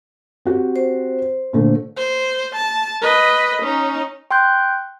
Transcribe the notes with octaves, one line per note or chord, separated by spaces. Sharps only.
C4 F#4 G4
C5
A#2 D3 A3
C5
A5
B4 D#5
C#4 D#4
G5 C6 F#6 G6